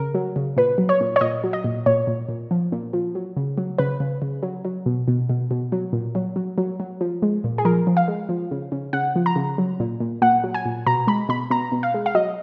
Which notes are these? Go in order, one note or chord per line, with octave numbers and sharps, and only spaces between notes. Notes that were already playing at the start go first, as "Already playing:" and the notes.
Already playing: C#3 A#4
F#3
C#3
A#2 B4
F#3
C#5
A#2
C#5
A#2 D#5
F#3
D#5
A#2
A#2 C#5
A#2
A#2
F3
A#2
F3
F#3
C#3
F#3
C#3 B4
C#3
C#3
F#3
F#3
B2
B2
B2
B2
F#3
A#2
F#3
F#3
F#3
F#3
F3
G#3
A#2
G#4
F3 A#4
F3
F5
G#3
F3
C#3
C#3
C#3 F#5
F3
A#5
C#3
F#3
A#2
A#2
A#2 F#5
F#3
G#5
A#2
B2 A#5
G#3 B5
B2 B5
B2 A#5
B2
F5
G#3
F5
F#3 D#5